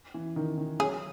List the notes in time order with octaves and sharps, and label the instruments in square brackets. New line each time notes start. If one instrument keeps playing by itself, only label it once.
[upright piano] E3
D#3
D#3
[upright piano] F#3 [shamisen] G#4